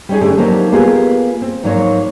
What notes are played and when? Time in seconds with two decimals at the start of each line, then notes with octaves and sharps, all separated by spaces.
0.09 G3 C#4 D#4 G#4
0.21 D3 A3 C#4 G4
0.38 F3 F#3 A#3 C4 D#4 G4
0.72 A#3 B3 F4 G4 G#4
1.42 C4
1.63 G#2 F3 F#3 A#3 A4 C#5